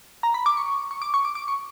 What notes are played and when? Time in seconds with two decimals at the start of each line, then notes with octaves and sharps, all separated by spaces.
0.23 A#5
0.34 B5
0.46 D6
0.57 C#6
0.91 C#6
1.02 D6
1.14 C#6
1.25 D6
1.35 D6
1.48 C#6